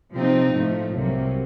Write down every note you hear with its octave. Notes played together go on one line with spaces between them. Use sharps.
C3 F3 C4 D#4
A2 F3 A3
C2 C3 F#3 A#3